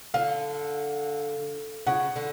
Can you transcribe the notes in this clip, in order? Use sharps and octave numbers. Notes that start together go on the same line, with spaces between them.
D3 F5
C#3 F#5
D3